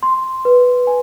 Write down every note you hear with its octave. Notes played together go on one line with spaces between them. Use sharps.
C6
B4
G#5